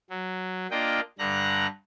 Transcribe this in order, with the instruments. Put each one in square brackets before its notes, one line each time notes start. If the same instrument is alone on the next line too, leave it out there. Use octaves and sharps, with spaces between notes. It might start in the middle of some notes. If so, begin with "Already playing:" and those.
[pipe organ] F#3
A#3 D4 F4 D#5 G5
G2 D3 A#5 F#6